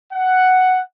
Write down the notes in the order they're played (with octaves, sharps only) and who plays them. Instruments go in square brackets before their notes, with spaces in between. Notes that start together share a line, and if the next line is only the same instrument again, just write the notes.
[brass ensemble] F#5